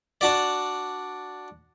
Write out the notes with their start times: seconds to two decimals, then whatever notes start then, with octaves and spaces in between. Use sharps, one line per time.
0.21 D4 F#4 D5